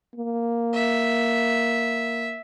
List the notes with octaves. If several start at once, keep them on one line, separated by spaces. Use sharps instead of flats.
A#3
E5